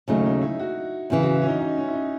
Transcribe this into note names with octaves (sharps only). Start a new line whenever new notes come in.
D#2 C#3 F#3 A3 D#4
D#4
E4
F#4
E2 C#3 E3
F#4
E4
C#4
D#4
D#4
C#4
E4
D#4